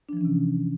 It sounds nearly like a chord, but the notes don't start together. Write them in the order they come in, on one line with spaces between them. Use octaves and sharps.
D4 F3 E3 C#4 C3